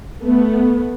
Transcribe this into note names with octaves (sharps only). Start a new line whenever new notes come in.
A3 B3